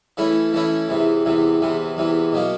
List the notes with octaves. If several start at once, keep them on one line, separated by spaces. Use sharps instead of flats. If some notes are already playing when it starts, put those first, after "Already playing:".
E3 A3 C#4 E4
E3 A3 C#4 E4
E2 C3 E3
E2 C3 E3
E2 C3 E3
E2 C3 E3
B2 F#3 A#3